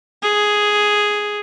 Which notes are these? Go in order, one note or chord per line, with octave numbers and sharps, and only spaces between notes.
G#4